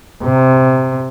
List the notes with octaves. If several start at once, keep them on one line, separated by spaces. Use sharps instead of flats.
C3